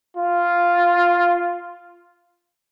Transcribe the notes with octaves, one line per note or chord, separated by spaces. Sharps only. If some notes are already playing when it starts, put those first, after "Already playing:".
F4